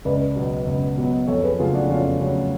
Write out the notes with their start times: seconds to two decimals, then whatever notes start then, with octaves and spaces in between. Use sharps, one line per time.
0.05 C#2 B4 D5
0.36 B2 F#3 B3
0.66 C#2
0.97 B2 F#3 B3
1.28 F2 A4 C#5
1.43 G#4 B4
1.59 C#3 F#3 A3 F4 G#4
1.74 D4 F#4
1.90 F2 C#4 F4
2.21 C#3 F#3 A3 C#4